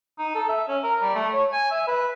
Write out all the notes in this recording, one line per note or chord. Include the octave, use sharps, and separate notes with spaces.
D#4
A4
E5
C#4
A#4
G3
A3
C#5
G#5
E5
B4